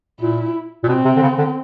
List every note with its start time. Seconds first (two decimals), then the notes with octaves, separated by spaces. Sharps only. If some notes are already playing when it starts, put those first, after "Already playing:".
0.21 A#2 E4
0.84 A#2
0.88 B2 C4
1.05 C3
1.16 D3
1.22 C#3
1.38 D3